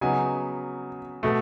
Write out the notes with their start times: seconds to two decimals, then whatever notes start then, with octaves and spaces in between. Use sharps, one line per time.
0.01 C#3 F#3 B3 D#4 G#5
1.23 B2 A3